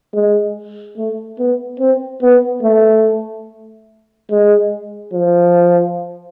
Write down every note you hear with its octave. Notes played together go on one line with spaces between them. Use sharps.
G#3
A3
B3
C4
B3
A3
G#3
F3